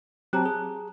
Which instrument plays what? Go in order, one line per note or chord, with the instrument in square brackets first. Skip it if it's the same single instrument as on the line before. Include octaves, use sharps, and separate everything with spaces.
[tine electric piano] F#3 C4 G4 [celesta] A5 A#5 F#6
[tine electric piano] G#4